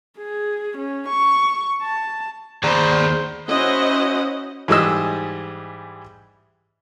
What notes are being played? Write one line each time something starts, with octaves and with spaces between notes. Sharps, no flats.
G#4
C#4
C#6
A5
D#2 G#4 C5 D5 A#5 B5
C#4 E4 F#4 C5 D#5 F#5
G#2 E3 G3 G#4 D#5 E6